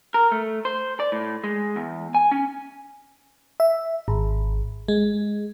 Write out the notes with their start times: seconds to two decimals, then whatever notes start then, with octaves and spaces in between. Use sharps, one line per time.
0.14 A#4
0.32 A3
0.65 C5
1.00 D5
1.12 A2
1.44 G#3
1.76 E2
2.15 G#5
2.31 C#4
3.60 E5
4.08 G#1
4.88 G#3